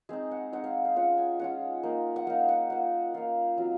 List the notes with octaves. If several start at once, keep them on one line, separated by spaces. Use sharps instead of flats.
G#3 C4 D#4 G#4
F#5
G#3 C4 D#4 F#5
F5
F5
G#3 C#4 F4 F#5
G#5
G#3 C#4 F4 F#5
A#3 D#4
F#5
A#3 D#4 F5
F#5
A#3 F4 F#5
A#3 F4 F5
F#3 C4 F4